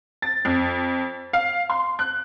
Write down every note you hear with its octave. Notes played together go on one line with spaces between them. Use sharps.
A6
F2
F5
C6
F#6